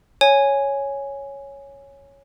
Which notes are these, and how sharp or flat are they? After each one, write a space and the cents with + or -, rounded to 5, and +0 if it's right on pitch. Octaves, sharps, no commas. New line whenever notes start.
C#5 +0 G#5 +0